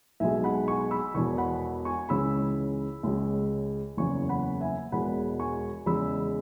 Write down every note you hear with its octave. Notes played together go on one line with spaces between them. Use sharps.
B1 B2 G#3 E5 G#5
F#5 B5
G#5 C#6
B5 E6
E1 E2 B2 G#5 C#6
F#5 B5
G#5 C#6
C#2 C#3 E3 G#3 B5 E6
C#2 C#3 G#3
F#1 E2 C#3 G#5 C#6
F#5 B5
E5 G#5
E1 E2 B2 G#3 F#5 B5
G#5 C#6
E2 C#3 G#3 B5 E6